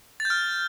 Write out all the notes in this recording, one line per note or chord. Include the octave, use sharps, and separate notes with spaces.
A6
G6
F6